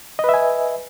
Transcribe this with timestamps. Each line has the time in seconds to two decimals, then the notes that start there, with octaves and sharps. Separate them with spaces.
0.19 D#5
0.24 B4
0.29 E5
0.34 G#5